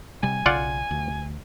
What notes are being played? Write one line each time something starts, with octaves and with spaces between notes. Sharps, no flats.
C3 G3 G#5
B1 C#3 F4 D5 F#5
D2